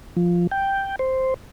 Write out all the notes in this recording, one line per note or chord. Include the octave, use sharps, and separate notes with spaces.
F3
G5
C5